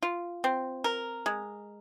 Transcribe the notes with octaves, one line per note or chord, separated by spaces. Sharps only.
F4
C4
A#4
G#3